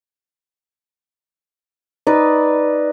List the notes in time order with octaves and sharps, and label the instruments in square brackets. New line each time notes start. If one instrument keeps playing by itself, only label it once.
[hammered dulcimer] D#4 B4 D5